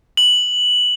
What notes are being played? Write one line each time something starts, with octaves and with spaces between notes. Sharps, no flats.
F#7